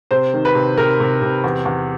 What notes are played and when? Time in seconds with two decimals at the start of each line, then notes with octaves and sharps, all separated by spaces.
0.11 C3 C5
0.33 D#3
0.45 B4
0.55 C3
0.77 C3 A#4
1.00 C3
1.22 C3
1.44 E2
1.65 E2